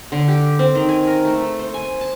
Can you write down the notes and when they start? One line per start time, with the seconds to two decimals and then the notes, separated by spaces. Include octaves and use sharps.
0.12 D3
0.28 G4
0.59 C4
0.75 D#3
0.89 G#5
1.07 A#4
1.25 A3
1.38 A4
1.59 C5
1.74 G#5
2.01 A5